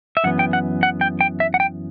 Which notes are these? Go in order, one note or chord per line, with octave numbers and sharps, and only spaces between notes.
E5
F#2 E3 B3 F#5
G5
F#5
F#5
G5
G5
E5
F#5
G5